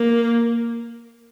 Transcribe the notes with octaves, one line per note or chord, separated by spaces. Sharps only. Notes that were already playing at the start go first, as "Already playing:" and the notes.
Already playing: A#3